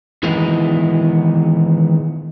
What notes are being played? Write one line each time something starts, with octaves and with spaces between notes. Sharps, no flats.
D#3 E3 G#3 B3 D#4 E4